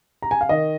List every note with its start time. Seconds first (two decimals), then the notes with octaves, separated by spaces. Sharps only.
0.22 A#5
0.31 G#5
0.41 F5
0.49 D#3 D#5